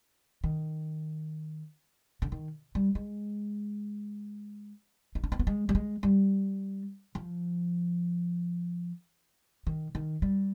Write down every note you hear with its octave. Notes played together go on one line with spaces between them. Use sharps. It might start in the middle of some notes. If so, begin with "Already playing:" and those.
D#3
D3
D#3
G3
G#3
D#4
D4
C4
B3
G#3
G3
G#3
G3
F3
D#3
D#3
G3